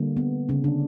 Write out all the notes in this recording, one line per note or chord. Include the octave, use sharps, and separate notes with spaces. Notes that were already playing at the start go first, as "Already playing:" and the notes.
Already playing: D3 G3 A#3
B3
C#3 C#4
D3 D4